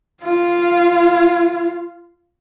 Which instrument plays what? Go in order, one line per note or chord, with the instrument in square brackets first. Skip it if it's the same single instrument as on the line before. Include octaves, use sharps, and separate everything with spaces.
[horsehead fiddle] F4 F5